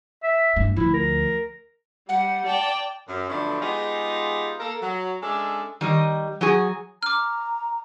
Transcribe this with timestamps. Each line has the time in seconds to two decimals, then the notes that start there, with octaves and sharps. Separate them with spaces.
0.23 E5
0.56 G2 C4
0.76 D2 F3 E4
0.94 A#4
2.09 G3 F#5
2.46 D5 G5 A5
3.08 F#2
3.29 D3 F3 F#3 A3 B3 D4
3.61 G#3 B3 D#4 F4 G4 G#4
4.59 A#3 A4 A#4
4.82 F#3
5.22 G#3 C#4 D4 A4 D5 E5
5.81 D#3 G3 D#5
6.41 F#3 F#4 G#4
7.03 A#5 D6 F6